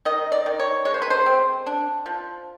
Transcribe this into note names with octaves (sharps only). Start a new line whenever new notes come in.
D#3 D#5
D5
D#3
C#5
G#3 C#5
C5
B4
C5
C4
D4
F3